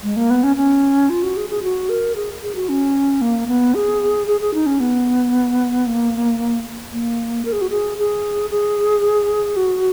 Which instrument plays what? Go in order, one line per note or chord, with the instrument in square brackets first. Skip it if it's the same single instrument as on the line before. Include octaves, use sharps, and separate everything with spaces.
[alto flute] G#3
A#3
B3
C#4
C#4
F4
F#4
G#4
G#4
F#4
A#4
G#4
G#4
F#4
C#4
A#3
B3
G#4
G#4
G#4
D#4
C#4
B3
A#3
A#3
A#4
G#4
F#4
G#4
G#4
G#4
F#4